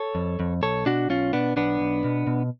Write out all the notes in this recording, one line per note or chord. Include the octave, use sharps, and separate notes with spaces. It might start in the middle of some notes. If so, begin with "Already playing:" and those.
Already playing: A4 C#5
F2
F2
B1 A4 C#5
B2 D4 F#4
B1 C#4 F4
B2 B3 D4
B1 B3 D4
B1
B2
B2